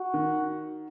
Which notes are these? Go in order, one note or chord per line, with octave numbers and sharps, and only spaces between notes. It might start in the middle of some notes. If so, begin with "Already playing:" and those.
Already playing: F#4
D#3